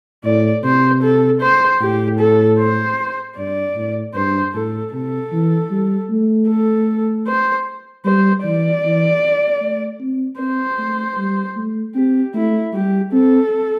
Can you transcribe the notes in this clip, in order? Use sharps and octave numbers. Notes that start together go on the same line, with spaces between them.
A2 D5
C3 C5
A4
C5
A2 G4
A4
C5
G2 D5
A2
G2 C5
A2 A4
C3 A4
E3
G3
A3
A4
C5
G3 C5
E3 D5
E3
A3
C4
C4 C5
A3
G3
A3
C4 G4
A3 E4
G3 G4
C4 A4